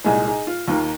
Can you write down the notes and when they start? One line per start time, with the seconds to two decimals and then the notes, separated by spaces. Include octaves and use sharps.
0.04 C2 A#2 G#3 D#4 G#4
0.25 D#4 G#4
0.47 F4
0.67 D#2 D#3 A#3 F4